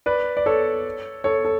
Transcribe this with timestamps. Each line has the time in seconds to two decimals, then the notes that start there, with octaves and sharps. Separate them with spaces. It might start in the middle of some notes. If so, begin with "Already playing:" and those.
0.06 B4 D5
0.37 D5
0.46 A4 C#5
1.24 A4 C#5
1.45 A4